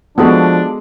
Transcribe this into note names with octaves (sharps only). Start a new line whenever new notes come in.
F3 G#3 B3 D4 F#4 A4